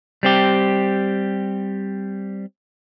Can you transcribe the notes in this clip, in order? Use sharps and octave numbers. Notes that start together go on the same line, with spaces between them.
G3 C4 G4